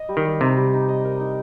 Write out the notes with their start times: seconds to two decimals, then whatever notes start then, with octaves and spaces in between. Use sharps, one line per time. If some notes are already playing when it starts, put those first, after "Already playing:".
Already playing: D#5
0.09 G3
0.17 D#3
0.25 G3
0.41 C3 D#4
0.57 G3
0.73 D#4
0.89 D#5
1.05 A#4
1.20 D#4